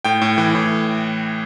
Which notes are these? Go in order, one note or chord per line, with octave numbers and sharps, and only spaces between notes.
A2 G5
A2
E3
A2